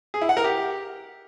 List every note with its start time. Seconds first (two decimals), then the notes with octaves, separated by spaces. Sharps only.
0.14 G#4
0.21 E4
0.29 F#5
0.37 A#4
0.44 G4